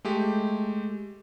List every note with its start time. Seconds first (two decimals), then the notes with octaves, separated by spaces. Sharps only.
0.05 G#3 A3 G4